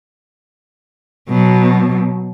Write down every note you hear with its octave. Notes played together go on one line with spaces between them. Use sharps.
B2 F#3